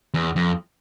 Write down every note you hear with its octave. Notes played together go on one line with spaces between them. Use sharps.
E2
F2